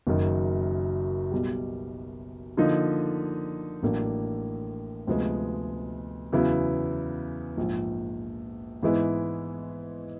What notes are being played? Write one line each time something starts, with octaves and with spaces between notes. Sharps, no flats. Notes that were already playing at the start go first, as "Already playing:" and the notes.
F#1 F#2 D#3
B1 B2 G3
D3 F3 A#3 D#4
A1 A2 F#3 A#3 D4
D2 C3 F3 G#3 B3
E2 C#3 F#3 B3 E4
A#1 G#2 F3
G#2 E3 G#3 B3 E4